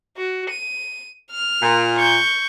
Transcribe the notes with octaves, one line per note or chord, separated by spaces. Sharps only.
F#4
D#7
F6
A#2
C#6 G6